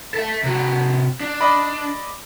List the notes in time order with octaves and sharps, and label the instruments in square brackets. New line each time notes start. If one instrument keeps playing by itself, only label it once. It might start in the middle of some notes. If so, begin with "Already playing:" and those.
[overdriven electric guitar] A4 E5
C3 F#4
D4
[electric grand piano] D5 D#5 B5